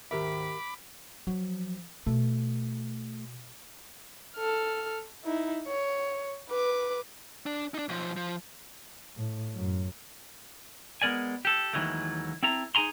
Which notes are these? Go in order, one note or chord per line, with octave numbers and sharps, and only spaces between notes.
D2 G#2 D#3 G4 A#4 E5 B5 D6
F3 F#3
B2 A3
A4 F6
D#4 E4
C#5
B4 D6
D4
D4 D#4
B1 F3
F3
A2
F#2
G#3 B3 A#4 D5 G#5
G4 A4
D#2 D#3 E3 F#3 G#3 A3
C4 E4 A4 A#5
D#4 G#4 G#5 A#5 C6